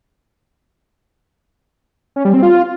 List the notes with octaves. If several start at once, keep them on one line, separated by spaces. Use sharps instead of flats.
C#4
G3
C4
F4